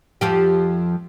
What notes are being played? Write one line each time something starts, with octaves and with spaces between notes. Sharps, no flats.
F2 F3 G4